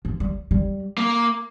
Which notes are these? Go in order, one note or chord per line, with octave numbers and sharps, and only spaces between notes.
F3
G3
G3
A#3